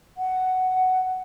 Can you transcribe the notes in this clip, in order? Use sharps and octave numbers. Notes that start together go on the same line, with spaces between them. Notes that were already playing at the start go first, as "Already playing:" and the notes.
F#5